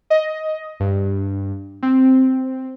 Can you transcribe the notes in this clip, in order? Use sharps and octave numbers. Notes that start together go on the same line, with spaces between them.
D#5
G2
C4